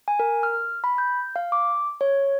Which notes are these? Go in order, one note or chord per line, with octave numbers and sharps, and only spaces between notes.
G#5
A#4
F6
B5
G6
F5
D6
C#5